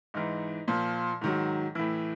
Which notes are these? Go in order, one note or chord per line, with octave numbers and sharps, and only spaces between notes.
G#2 E3 D#4
A#2 F3
G#2 D#3 F#3
A2 E3 E4